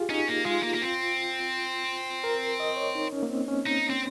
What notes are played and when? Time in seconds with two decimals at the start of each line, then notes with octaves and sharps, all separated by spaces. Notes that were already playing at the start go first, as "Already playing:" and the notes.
Already playing: F4 G4 G#4
0.10 C#4 D#4
0.28 A#3
0.45 G#3 F4
0.63 A#3
0.74 A#3
0.82 C4
2.24 A#4
2.60 D#5
2.77 C#5
2.95 D#4
3.13 C#4
3.23 A#3
3.30 C4
3.48 C#4
3.66 D#4
3.90 C4